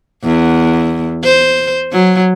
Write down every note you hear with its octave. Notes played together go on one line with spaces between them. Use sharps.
E2
C5
F#3